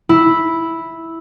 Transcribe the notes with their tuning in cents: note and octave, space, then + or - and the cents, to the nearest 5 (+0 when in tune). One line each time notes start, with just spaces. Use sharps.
E4 -5